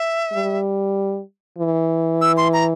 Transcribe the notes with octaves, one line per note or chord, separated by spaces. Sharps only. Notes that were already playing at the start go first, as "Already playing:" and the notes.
Already playing: E5
G3
E3
E6
C6
A#5